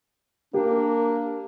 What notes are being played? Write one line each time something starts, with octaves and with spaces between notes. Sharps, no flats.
A#3 D4 G4